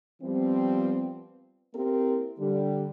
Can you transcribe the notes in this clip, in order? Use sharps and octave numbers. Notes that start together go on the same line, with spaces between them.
F3 G3 B3 C4
A#3 C4 E4 G4 A#4
D3 G3